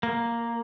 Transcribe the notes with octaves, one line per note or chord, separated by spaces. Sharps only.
A#3